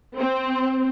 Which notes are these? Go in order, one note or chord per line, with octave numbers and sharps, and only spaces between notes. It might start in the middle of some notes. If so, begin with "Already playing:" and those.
C4